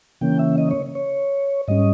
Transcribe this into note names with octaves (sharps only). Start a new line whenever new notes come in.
C#3 E3 A#3 C#4 G5
E5
D#5
C#5
C#5
G#2 G3 C#4 D#5